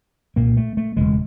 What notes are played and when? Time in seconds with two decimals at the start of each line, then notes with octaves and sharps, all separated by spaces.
0.36 C2 A#2 A#3
0.57 A3
0.77 A3
0.96 E1 E2 C#3 G#3